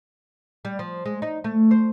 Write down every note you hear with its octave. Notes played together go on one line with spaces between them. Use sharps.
G3
F3
G#3
D#4
A3
C5